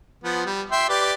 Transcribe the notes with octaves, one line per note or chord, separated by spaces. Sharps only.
F3 B3
G3
E5 G5 C6
G4 B4 D5